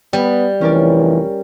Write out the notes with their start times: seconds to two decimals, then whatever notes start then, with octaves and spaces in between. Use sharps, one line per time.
0.13 G3 B3
0.61 F1 E3 C#4 A#4 D5